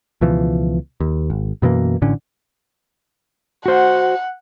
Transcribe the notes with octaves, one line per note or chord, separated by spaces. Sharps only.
C#2 B2 E3 F3
D#2
G#1
F#2 B2 E3 A#3
A1 A2 D3 C#4
F#4 C5 F#5